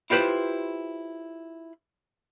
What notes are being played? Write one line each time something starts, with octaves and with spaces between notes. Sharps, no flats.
E4 F4 G4 B4 C5